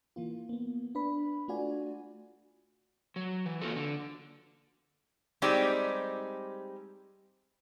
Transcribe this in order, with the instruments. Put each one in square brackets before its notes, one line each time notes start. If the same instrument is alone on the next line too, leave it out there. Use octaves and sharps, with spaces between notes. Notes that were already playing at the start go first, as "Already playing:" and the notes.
[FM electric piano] E3 A#3 F4
A#3 B3
D4 B4 B5
A3 D4 F4 F#4 D5 G#5
[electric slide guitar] F#3
E3
A#3 F4 F#4 A4
D3
[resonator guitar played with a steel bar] G3 G#3 C4 D#4 G4 D5